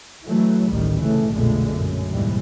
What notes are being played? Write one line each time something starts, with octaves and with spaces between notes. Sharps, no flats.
E3 F#3 A3
A1 D2 A2 D#3 G3
F1 A2 C#3 E3 A3
B1 F2 A#2 D3 G#3 A3
F#2
D#2 G#2 B2 E3 G3